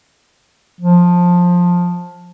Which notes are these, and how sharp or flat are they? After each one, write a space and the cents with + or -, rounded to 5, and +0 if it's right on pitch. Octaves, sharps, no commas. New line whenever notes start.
F3 +15